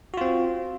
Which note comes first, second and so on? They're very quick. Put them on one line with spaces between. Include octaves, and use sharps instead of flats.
F#4 F4 C4